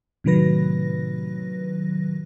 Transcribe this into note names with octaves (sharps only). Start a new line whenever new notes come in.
A2 C3 D#3 F#3 B4 A#6